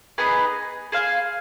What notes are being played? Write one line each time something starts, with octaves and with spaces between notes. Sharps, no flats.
B3 D#4 G#4 B4
G#4 C5 F5 G#5